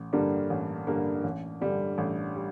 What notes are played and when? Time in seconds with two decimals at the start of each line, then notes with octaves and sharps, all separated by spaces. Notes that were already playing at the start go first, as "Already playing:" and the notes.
Already playing: A1
0.13 G2 D3 G3 A#3
0.50 A1
0.87 G2 D3 G3 A#3
1.24 A1
1.61 G2 D3 G3
1.98 A1
2.36 G3